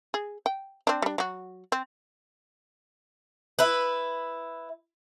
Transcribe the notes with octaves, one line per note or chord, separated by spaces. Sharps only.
G#4
G5
C4 D4
G3 D4
F#3 F#4
C4
E4 B4